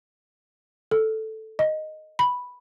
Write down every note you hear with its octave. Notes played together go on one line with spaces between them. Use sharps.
A4
D#5
B5